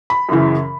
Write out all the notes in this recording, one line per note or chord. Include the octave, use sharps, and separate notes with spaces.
B5
F#2 C#3 E3